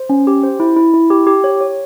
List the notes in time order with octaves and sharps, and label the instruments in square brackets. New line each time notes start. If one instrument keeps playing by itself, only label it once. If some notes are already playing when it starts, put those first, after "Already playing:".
Already playing: [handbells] C5
C#4
G4
C5
E4
E4
E4
G4
G4
C#5
C#5